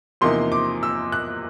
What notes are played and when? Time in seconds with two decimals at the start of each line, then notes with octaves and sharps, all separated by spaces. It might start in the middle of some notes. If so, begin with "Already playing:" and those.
0.21 E2 C3 F3 A#3 D#4 C6
0.52 D6
0.83 E6
1.12 F#6